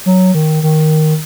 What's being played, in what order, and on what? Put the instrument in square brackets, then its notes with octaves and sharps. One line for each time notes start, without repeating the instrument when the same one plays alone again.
[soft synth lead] F#3
D#3
D#3